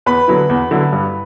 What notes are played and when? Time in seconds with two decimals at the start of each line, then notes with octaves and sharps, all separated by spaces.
0.06 E2 B4 B5
0.28 D3 F#3 B3 E4
0.49 E2
0.71 D3 F#3 B3 E4
0.92 G2